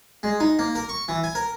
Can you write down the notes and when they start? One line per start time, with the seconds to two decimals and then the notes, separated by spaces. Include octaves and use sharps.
0.23 G#3
0.40 D#4
0.59 A#3
0.75 A#4
0.89 C#6
1.08 E3
1.24 G#5
1.35 A#4